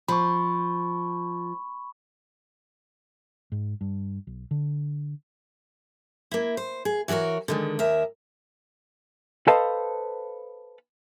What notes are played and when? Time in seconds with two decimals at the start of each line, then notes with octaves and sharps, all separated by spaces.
0.08 F3 B5 C#6
3.52 G#2
3.81 G2
4.27 B1
4.51 D3
6.31 A#3 E4
6.57 C5
6.85 G#4
7.08 E3 F#4 A4 A#4 C#5
7.48 D3 D#3 G#3
7.79 D#2 A#4 E5
9.47 A4 B4 C5 D#5 F5 A5